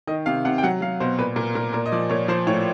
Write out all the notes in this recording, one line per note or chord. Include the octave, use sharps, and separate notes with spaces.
D#3 D#5
C3 F5
C3 F#5
G5
F#3 F#5
F#3 F5
B2 C5
A#2 B4
A#2 A#4
A#2 A#4
A#2 A#4
D#5
F3 D5
A#2 C#5
F3 C5
A2 C#5